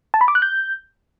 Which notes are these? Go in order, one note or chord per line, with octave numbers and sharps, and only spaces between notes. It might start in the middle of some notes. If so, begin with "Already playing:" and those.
A5
B5
D6
F#6
G6